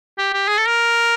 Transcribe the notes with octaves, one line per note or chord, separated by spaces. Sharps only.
G4
G4
G#4
A4
A#4